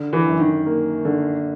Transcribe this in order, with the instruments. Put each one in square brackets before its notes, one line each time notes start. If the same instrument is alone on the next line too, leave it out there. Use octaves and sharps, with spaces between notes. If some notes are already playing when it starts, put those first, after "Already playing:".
Already playing: [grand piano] D3
[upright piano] E3
[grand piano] F#2
[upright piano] D#3
[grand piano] A#3
D3